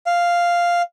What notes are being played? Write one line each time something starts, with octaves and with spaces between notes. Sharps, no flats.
F5